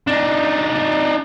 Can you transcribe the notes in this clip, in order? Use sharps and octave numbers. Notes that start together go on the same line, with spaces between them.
D4 D#4